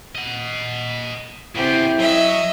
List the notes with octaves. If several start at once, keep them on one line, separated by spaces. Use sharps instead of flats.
D#5 F#5
C#3 B3 C4 E4 G4
F#3 D#5 E5